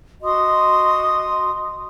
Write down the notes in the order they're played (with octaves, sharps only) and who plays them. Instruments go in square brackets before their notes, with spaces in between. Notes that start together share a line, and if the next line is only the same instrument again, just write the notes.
[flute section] F#4 D#5 C6 D#6